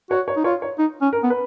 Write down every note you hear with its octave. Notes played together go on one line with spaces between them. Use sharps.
F#4 C#5
C#5
D#4
F4 C#5
C#5
D#4
C#4
A#4
B3
B4